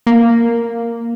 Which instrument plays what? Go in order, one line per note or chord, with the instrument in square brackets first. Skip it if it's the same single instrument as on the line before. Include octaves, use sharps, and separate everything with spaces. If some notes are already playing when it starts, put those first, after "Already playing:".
[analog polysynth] A#3